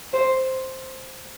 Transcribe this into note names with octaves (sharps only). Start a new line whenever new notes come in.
C5